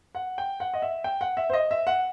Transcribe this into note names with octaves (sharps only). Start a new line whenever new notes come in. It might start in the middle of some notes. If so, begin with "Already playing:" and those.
F#5
G5
F#5
D#5
E5
G5
F#5
E5
C5
D#5
E5
F#5